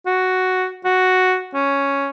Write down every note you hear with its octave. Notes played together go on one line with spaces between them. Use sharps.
F#4
F#4
C#4